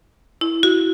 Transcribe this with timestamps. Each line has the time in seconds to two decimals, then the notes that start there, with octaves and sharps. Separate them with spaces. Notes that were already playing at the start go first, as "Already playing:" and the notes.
0.41 E4
0.63 F#4